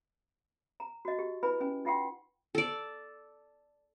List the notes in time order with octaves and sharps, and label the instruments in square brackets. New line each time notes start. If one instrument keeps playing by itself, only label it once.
[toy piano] A#5
F#4 D#5
G4
E4 B4 G#5 B5
C#4 G#5
D#4 F4 F#5 G5 C6
[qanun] A4 D5